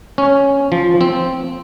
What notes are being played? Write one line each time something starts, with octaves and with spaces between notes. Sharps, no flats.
C#4
F3
C4